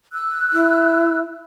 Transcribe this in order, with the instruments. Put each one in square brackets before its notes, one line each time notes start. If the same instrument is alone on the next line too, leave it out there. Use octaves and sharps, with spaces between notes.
[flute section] E6 F#6
[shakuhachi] E4